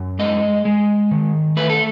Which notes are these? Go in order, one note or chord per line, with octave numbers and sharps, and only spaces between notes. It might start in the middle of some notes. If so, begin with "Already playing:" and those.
Already playing: F#2
G#3 D#5
G#3
D#3
A3 B4
A4